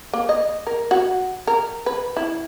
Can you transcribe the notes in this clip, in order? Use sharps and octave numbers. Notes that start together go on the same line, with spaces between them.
A#3
D#5
A#4
F#4
A#4
B4
E4